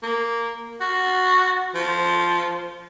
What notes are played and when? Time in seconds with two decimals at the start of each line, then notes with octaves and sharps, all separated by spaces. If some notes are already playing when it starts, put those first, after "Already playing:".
0.03 A#3
0.80 F#4
1.75 F3